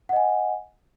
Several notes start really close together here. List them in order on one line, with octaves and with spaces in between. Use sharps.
F#5 D#5 G#5